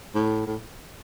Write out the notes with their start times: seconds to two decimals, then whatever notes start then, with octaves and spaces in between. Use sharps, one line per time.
0.15 A2
0.47 A2